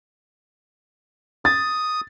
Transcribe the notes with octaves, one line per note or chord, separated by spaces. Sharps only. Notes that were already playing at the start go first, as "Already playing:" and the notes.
D#6 A6